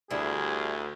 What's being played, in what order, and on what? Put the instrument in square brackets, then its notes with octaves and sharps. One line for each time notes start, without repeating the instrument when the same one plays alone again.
[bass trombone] D2 [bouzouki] G3 E4 [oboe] G#4